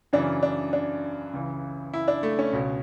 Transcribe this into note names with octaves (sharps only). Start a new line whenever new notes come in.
F#2 C#3 E3 D4
D4
D4
C#2 C#3 E3
E4
D4
A3
C#4
C#2 B2